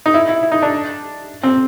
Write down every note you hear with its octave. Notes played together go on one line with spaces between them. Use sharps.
D#4
E4
E4
E4
D#4
D4
C4